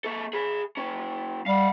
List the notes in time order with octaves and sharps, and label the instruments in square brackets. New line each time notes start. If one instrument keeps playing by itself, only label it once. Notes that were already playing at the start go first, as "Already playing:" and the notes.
[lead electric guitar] A#3 A4
G#4 B5
A#3 C#4
[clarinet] G3 [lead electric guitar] F5 F#5